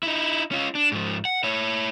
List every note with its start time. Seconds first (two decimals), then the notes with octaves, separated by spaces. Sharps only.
0.03 D#4 E4
0.51 C#4 F4
0.75 D4
0.92 G#2 F3
1.25 F#5
1.44 E4 C#5